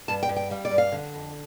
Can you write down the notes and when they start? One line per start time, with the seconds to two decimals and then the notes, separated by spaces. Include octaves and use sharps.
0.08 G2 A5
0.23 G5
0.29 G2
0.36 G5
0.50 G3 F5
0.65 D5
0.71 G2
0.78 F5
0.92 D3
1.14 F2